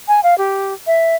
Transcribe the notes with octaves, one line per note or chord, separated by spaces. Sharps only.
G#5
F5
G4
E5